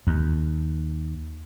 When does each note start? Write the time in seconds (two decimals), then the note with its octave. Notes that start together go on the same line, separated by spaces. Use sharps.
0.07 D#2